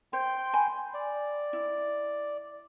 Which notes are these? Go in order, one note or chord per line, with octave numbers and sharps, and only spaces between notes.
C5 G5 C6
G#5 B5
D5
E4